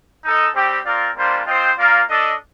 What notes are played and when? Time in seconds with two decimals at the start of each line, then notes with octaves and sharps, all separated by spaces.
0.24 D#4 A4 D#5
0.54 G3 C4 G4
0.85 C4 F4 A#4 D5
1.16 G3 A#3 D4 F4 C5
1.47 C4 F4 C5 D#5 G5
1.77 A#3 F4 A#4 D5 F5
2.09 D4 A4 D#5